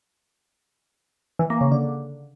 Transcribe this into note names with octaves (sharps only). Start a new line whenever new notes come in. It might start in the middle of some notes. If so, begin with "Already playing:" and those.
E3
A#3
C#3
D3